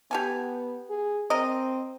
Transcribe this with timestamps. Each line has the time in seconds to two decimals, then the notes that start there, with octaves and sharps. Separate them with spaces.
0.11 B3 G4 A4 G#5
0.90 G#4
1.30 C4 A#4 D#5